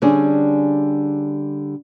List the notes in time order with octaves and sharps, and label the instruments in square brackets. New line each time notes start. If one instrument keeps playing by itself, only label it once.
[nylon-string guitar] D3 G3 C#4 D4 G#4